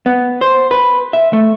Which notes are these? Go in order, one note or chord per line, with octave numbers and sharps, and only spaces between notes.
B3
C5
B4
E5
A3